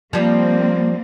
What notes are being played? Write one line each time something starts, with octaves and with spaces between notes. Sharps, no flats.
F3 G3 A#3 C4